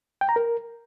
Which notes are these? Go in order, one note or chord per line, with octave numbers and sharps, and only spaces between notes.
G5
A#5
A#4